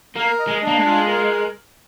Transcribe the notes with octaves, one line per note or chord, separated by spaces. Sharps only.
A#3 A#4
D#5
G#3
A#3 D4
G#3
F4
A#4